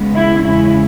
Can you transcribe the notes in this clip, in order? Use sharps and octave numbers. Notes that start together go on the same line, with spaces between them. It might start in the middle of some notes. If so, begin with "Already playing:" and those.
Already playing: C#3 G#3 B3
E4
E2 C#3 G#3 C#4 E4